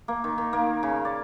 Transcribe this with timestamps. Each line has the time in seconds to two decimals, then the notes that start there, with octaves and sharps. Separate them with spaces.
0.08 A#3
0.24 D#3
0.38 D#3
0.53 A#3
0.83 C#3
1.05 D5